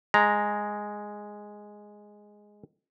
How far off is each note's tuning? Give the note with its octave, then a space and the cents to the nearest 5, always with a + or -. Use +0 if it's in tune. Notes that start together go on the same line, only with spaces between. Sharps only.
G#3 +0 A#5 +0